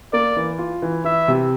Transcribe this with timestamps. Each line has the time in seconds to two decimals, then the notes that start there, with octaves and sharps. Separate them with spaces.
0.13 A#3 D5
0.36 E3
0.58 F4
0.82 E3
1.04 E3 E5
1.28 C3